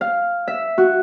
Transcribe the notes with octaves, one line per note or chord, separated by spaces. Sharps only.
F5
E5
F#4